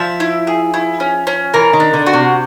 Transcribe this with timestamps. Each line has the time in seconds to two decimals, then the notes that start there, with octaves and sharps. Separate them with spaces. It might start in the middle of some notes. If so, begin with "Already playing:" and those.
Already playing: F3 E5
0.20 E4
0.47 G#4
0.74 E4
1.00 C#4
1.27 C#4
1.54 E3 A#4
1.73 D#3
1.80 D4
1.93 D3
2.06 F#4
2.13 C3